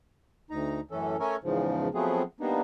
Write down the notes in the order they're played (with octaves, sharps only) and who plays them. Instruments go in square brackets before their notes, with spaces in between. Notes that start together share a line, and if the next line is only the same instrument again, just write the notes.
[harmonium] D2 D#4 A#5
F#2 A2 E3 C#4 A4
A3 C#4 A4 A#4 C#5 G#5
E2 G#2 C#3 F3
F3 F#3 A3 B3 C4 G#4
G3 A#3 B3 D4 D#4